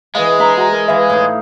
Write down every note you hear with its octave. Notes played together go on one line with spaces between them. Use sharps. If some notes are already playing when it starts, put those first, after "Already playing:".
E3 G#3 B4 D5 D#5 F5
D4 E5 A#5
F#4 A#5
A#4
E3 E5 F5
A2 D#4